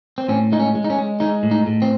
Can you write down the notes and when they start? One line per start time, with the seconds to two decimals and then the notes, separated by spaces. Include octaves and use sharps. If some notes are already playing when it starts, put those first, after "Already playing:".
0.18 C4
0.28 A2 C#4
0.52 G#3 D#4
0.59 C#4
0.75 G#3
0.84 D#4
0.90 C#4
0.98 G#3
1.20 G#3 D#4
1.43 A2
1.51 D#4
1.67 A2
1.82 C4